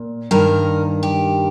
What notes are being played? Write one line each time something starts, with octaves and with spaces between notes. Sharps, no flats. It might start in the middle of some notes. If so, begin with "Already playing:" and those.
Already playing: A#2
G2 D#3 A#4
G4